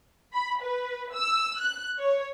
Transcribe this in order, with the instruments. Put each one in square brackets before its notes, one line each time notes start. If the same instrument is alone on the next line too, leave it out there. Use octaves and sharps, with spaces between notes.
[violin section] B5
B4
E6
F#6
C#5